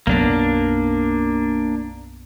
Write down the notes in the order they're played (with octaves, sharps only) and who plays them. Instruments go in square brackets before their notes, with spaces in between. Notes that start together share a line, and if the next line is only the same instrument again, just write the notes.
[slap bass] B1 F#2 B3 [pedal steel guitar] A#3 D4